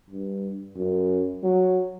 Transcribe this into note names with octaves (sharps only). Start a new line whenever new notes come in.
G2
F#2
F#3